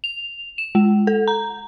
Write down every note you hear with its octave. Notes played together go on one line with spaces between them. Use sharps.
F7
E7
G#3
A4
A#5